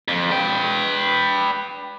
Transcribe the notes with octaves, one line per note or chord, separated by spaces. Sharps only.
F2
B4 G5